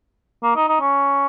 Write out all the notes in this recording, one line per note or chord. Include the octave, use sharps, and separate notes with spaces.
A#3
D#4
D#4
C#4